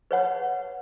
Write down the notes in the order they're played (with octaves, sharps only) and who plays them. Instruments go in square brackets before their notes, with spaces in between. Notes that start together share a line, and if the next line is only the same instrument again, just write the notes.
[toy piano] B4 C#5 F#5